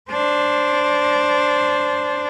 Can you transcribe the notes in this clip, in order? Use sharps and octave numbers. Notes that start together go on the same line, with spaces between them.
D4 C5